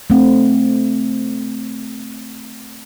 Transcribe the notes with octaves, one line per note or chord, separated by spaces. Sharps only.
A3 C4